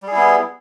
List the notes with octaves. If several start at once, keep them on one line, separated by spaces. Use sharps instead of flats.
G3 B3 E4 G#4